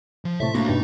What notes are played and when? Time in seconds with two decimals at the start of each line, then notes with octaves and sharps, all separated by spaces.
0.25 F3
0.40 A2 C3 A3 E5
0.55 A3 A#3 D4 F#4
0.69 G2 B2 D#4